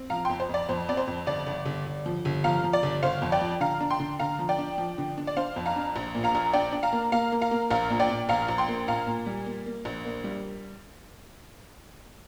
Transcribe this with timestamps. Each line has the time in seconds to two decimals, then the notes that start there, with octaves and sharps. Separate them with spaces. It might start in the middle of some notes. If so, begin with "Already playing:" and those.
Already playing: C4
0.10 F3 F5 A#5
0.25 F2 G5 C6
0.40 C5
0.49 F2 D5
0.69 F2 C5
0.89 C4 D5
0.97 C5
1.08 F2
1.26 G1 D5
1.47 G1
1.66 G1
1.86 G1
2.06 F3
2.25 G1
2.44 F3 F5 A#5
2.64 F3
2.73 D5
2.83 G1
3.03 G1 C5 F5
3.22 F2
3.32 D5 G5
3.41 F3
3.61 D3 F5 A#5
3.81 D4
3.90 G5 C6
4.00 D3
4.19 D3 F5 A#5
4.39 F3
4.49 D5 G5
4.59 D4
4.78 F3
4.98 D3
5.17 D4
5.27 D5
5.36 D4 C5 F5
5.56 F2
5.66 F5 A#5
5.76 D4
5.96 A#1
6.15 A#2
6.24 F5 A#5
6.35 A#1
6.53 D4 D5 G5
6.73 D4
6.83 F5 A#5
6.93 A#3
7.12 A#3 F5 A#5
7.32 A#3
7.41 F5 A#5
7.51 A#3
7.71 A#1 F5 A#5
7.90 A#2
8.00 D5 G5
8.10 A#2
8.29 A#1 F5 A#5
8.48 A#1
8.58 G5 C6
8.68 A#3
8.88 A#2 F5 A#5
9.07 A#2
9.26 G3
9.46 A#3
9.66 A#3
9.85 A#1
10.05 A#3
10.24 G3